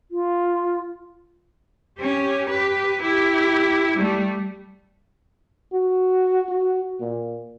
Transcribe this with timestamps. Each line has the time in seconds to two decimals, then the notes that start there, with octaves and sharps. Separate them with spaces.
0.11 F4
1.98 C#4 G4
2.48 G4 B4
3.01 E4 G4
3.96 G3 A3
5.73 F#4
6.49 F#4
7.01 A#2